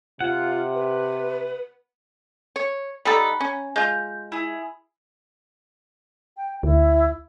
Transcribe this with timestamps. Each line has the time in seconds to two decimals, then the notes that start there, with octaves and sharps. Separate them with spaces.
0.20 C3 F4 F#5
0.74 B4
2.56 C#5
3.05 G3 D#4 A4 F#5 A#5 B5
3.40 C#4
3.76 G#3 F4 G6
4.32 E4 G#4
6.37 G5
6.63 D2 E4